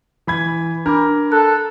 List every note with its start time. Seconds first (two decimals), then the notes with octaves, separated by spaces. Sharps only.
0.27 E3 B5 G#6
0.86 D4 A#4 B5 D6
1.32 A4 F#6